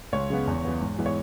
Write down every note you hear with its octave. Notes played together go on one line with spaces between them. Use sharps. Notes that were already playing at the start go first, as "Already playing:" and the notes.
C#2 C#5
C#3 G#3 B3
E2
E3 B3
G#2
E3 G#3 B3
C#5